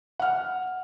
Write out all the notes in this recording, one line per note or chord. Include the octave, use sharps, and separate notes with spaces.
F#5 F6